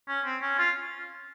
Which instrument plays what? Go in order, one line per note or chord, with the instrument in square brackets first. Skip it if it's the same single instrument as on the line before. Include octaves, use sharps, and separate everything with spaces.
[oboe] C#4
C4
C#4
F4